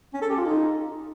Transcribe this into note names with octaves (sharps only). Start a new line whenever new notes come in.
C#4
A4
G4
F4
D#4